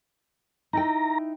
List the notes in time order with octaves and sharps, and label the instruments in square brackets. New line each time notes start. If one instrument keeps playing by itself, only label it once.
[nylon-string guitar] D#4 E4 G5 [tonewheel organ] A#5